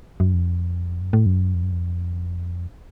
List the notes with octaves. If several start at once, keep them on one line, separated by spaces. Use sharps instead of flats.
F#2
F2
F#2
A2
F#2
F2
F#2
F2